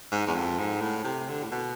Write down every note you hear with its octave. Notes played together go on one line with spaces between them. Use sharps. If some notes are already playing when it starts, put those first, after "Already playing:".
G#2
E2
F2
G#2
A2
C3
D3
A2
B2